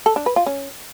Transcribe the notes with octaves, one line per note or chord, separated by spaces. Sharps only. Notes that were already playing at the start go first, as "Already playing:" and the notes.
A4
D4
B4
F4
C#4